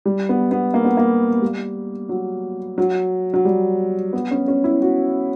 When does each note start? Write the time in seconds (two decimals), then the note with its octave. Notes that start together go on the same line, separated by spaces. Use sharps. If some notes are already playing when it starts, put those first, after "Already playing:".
0.05 G3
0.29 B3
0.51 B3
0.74 A#3
0.85 B3
0.97 A#3
1.42 G3
2.09 F#3
2.78 F#3
3.34 F#3
3.45 G3
4.13 B3
4.31 C#4
4.48 C#4
4.64 E4
4.82 F#4